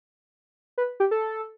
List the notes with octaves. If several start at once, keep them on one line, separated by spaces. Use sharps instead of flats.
B4
G4
A4